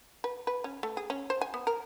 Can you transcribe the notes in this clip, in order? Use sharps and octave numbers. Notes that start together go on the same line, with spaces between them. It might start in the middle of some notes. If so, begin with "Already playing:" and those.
B4
B4
C#4
A3
G#4
C#4
C5
G#5
B3
A#4